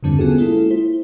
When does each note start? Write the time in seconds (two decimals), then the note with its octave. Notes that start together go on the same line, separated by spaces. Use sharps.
0.03 E2 G2 D3 G3 C4 D4
0.19 B3 C#4 F4 F#4 G#4 A4
0.38 G#3 A#3 E4 F4 A4
0.70 E4 C5